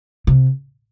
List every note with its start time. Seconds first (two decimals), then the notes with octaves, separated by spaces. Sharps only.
0.27 C3